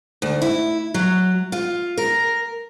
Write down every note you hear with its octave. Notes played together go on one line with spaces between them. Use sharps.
D2
E4
F#3
F4
A#4